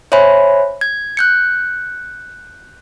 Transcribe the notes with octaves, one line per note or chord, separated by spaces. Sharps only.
C5 C#5 E5 G#5 B5
G#6
F#6 G6 C#7